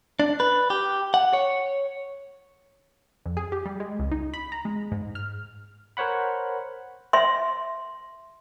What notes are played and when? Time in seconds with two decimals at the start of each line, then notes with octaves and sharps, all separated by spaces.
0.20 D4
0.40 B4
0.70 G4
1.14 F#5
1.33 C#5
3.26 F2
3.37 G#4
3.52 G4
3.65 G3
3.80 G#3
3.99 C#2
4.11 D#4
4.34 B5
4.52 A#5
4.65 G#3
4.92 G#2
5.15 F6
5.97 A#4 C5 C#5 F#5 B5
7.13 E5 C6